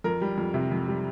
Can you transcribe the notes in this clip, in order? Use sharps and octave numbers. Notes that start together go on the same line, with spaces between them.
F2 A#4
G3
F2
C3
F2
G3